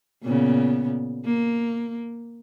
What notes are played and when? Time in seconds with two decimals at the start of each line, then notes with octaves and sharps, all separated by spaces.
0.24 A#2 C#3 B3
1.25 A#3